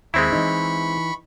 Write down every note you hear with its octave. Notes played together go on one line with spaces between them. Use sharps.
D#2 G#3 C4 E4 B5 C#6
E3 D#4